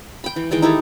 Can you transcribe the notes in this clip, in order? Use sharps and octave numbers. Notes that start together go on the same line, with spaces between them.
G5 B5
E3
D#3 E3 G#3 G5
D#4 E4 G4 A4